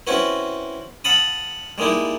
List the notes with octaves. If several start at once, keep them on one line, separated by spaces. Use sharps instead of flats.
C4 C#4 E4 F#4 B4
F5 F#5 A5 B5 D#6
G3 G#3 A#3 D#4 E4